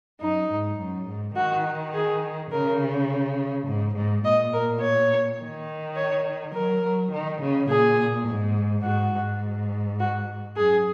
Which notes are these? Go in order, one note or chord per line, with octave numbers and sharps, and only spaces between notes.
F#2 D#4
G#2
F#2
G#2
D#3 F#4
G#4
C#3 A#4
G#2
G#2
A#2 D#5
A#4
C#5
D#3
C#5
F#3 A#4
F#3
D#3
C#3
A#2 G#4
G#2
G#2 F#4
G#2
F#4
F#2 G#4